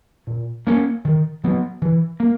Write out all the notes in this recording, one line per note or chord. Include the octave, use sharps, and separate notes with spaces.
A#2
A#3 C#4
D#3
F#3 B3
E3
A#3